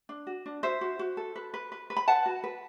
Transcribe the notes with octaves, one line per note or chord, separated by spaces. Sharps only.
D4
F#4
D4
F#4 C5 E5
F#4
F#4
A4
B4
B4
B4
B4
B5
B4 F#5 A5
F#4
B4